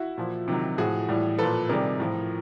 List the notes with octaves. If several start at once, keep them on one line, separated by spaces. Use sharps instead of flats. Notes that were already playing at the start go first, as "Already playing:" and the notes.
Already playing: E4 F#4
A#2 F3
C3 D#3 F#3
A2 F3 F#4 G#4
A2 E3 G3
A#2 F3 A4 B4
C3 D#3 G3 G#4 A#4
A2 F3